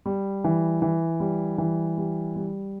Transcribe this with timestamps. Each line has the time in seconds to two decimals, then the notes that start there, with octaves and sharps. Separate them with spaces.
0.06 G3
0.44 E3
0.82 E3
1.20 G3
1.58 E3
1.97 G3
2.36 G3